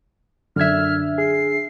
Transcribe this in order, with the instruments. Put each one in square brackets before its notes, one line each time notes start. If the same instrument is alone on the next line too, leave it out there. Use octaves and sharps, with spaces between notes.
[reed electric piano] F#2 G#6 [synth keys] D3 E5 [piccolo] F6
[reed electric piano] G#4 [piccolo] C7